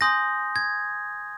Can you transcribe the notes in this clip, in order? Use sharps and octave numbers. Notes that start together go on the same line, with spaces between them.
G#5 C6 D#6 G6 A#6
G#6